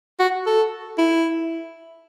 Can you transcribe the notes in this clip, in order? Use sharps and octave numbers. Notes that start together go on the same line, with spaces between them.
F#4
A4
E4